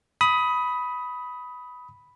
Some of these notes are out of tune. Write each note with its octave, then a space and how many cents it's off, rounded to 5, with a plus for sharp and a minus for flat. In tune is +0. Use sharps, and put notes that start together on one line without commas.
B5 +0 D#6 +20